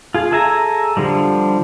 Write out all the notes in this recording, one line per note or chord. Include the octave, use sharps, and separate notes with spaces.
F4 G#4
G#4 A4 E5 G#5 A#5
D3 F3 G3